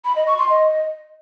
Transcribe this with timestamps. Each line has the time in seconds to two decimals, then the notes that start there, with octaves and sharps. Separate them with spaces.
0.05 B5
0.16 D#5
0.27 C#6
0.38 C6
0.50 D#5